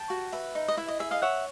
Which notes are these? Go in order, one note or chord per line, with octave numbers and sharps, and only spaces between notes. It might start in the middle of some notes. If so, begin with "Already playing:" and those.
Already playing: G5 A5
F#4
B4 E5
D#4
D#5
E4 E5
D#5
G#4 E5
D#5 F5
C#5 E5 F#5